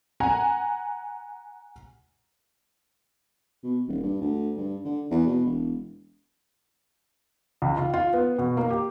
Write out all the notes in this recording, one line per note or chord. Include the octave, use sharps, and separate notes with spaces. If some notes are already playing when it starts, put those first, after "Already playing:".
F#5 G#5 A#5
B2
D#1
G2
D2
G2
D3
E2
B2
E1
C#2
F4
F4
B3
B2
A#3
G4